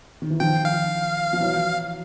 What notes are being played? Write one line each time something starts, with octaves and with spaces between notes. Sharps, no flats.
D#3
E3
D#3 F3 G5
F5
F3
E3 F#3